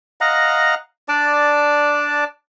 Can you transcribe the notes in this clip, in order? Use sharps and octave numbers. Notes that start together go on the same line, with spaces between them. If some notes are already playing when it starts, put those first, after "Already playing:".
D#5 F5 F#5 A#5
D4 D5 A5 D6